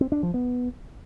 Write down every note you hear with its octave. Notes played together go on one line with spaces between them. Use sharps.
C4
D4
F3
B3